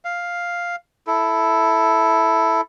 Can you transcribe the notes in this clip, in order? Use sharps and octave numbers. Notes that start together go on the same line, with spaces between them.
F5
E4 A4